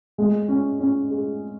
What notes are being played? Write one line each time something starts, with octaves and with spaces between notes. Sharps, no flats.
G#3
C#4
C#4
G#4